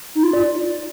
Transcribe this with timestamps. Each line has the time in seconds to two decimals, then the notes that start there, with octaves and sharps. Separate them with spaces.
0.15 D#4
0.23 F4
0.33 D5